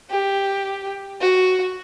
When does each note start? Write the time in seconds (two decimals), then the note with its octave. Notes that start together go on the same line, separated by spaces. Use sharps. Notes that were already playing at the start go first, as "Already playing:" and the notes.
0.10 G4
1.21 F#4